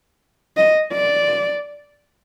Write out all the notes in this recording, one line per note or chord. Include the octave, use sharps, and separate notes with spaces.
D#5
D5